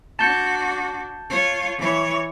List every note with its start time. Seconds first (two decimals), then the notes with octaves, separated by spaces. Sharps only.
0.19 D4 F#4 A5 G6 C#7
1.30 F4 C#5
1.79 E3 C#5